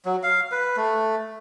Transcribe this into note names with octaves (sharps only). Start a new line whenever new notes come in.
F#3
F5
B4
A3